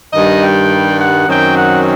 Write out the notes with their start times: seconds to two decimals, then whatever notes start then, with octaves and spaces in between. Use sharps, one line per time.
0.13 G2 D#3 G3 D#5
0.42 G5
0.99 F#5
1.27 F#2 D#3 F#3 C4 G5
1.56 F#5